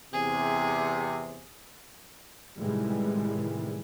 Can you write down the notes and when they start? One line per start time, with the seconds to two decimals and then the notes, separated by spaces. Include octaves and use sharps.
0.13 E2 C3 G#4
2.58 A2 C3 D#3 E3 G3 G#3